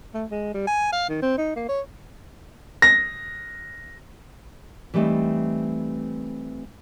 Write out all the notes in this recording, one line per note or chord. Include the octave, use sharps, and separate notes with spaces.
A3
G#3
G3
G#5
F5
D#3
C4
D#4
A#3
C#5
A#6
E3 G3 A3 C4 D#4